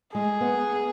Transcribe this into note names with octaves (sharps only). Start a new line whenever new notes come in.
G#3 G#4
B3